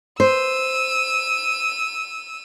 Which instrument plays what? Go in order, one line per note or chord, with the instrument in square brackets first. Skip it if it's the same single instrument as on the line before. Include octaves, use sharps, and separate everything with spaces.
[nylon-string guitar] C5 [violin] E6 D#7